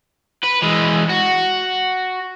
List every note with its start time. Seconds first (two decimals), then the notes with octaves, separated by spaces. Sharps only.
0.44 B4
0.62 E3 G#3
1.09 F#4